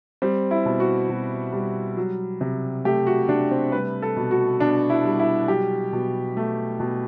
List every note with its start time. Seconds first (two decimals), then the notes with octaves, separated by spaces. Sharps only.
0.22 G3 C4
0.51 E4
0.65 B2
0.80 F#4
1.09 B2
1.53 G3
1.97 F#3
2.41 C3
2.85 A3 G4
3.07 F#4
3.28 C3 D4
3.51 C4
3.72 G3 B4
4.02 A4
4.16 B2
4.31 F#4
4.60 B2 D4
4.90 E4
5.05 G3
5.19 E4
5.48 F#3 G4
5.93 B2
6.37 A3
6.80 B2